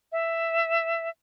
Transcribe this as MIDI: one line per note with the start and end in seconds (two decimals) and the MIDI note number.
0.12 1.09 76